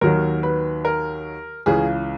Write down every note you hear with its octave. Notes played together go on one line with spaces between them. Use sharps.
D#2 D#3 F#3 A#4
B4
A#4
C#2 C#3 E3 G#4